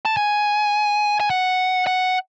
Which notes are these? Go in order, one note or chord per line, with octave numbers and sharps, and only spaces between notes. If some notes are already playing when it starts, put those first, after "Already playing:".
A5
G#5
G#5
F#5
F#5